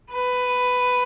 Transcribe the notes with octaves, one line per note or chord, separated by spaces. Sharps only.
B4